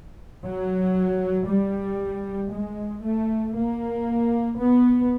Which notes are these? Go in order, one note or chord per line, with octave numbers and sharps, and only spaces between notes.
F#3
G3
G#3
A3
A#3
B3